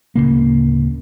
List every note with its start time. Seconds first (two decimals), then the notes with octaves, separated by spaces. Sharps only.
0.15 D1 C2 C#3 A#3